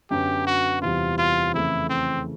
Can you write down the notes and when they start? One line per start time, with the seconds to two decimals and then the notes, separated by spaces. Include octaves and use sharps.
0.10 F#2 D3 F#3 B3 G4
0.47 F#4
0.82 E2 C3 E3 G3 F4
1.18 F4
1.54 F2 C#3 E3 A3 E4
1.90 C4